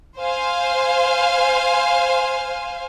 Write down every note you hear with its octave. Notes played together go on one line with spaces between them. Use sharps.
C5 F5 G#5